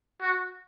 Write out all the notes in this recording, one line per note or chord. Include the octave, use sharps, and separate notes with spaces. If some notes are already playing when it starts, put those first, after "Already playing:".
F#4